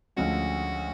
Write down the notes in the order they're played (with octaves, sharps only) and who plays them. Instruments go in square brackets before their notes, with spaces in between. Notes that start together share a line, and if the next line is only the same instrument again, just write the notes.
[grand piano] D2 D3 F3 G#3 C#4 [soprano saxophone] F#4